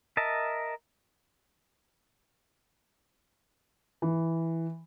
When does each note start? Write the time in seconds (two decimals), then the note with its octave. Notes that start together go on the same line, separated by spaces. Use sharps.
0.17 A#4 D#5 E5 A5
4.02 E3